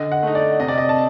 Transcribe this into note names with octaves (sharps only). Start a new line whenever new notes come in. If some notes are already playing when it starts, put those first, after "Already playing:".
Already playing: D3 D#5
F#5
A3 D#4
D5
C3 D#5
D5
D#5
A5